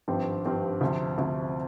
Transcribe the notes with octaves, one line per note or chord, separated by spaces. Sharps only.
G#1 G2 F3 C4 G4
G#1 G2 F3 C4 G4
D2 C3 F3
D2 C3 F3